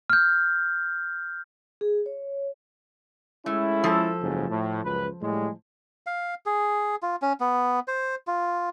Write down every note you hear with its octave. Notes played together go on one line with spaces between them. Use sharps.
F6 G6
G#4
C#5
G#3 A3 C#4 E4
F3 A4
F#1 G#2 C#3
A2
C#2 F#2 B4
A2 G3 G#3
F5
G#4
F4
C#4
B3
C5
F4